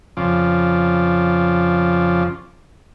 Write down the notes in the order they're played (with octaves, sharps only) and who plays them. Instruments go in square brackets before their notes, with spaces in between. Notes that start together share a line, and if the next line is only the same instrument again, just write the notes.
[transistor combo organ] F2 C#3 F3 D5